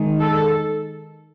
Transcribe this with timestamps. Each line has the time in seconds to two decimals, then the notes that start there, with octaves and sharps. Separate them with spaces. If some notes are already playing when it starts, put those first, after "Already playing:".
Already playing: D#3 G#3
0.20 A4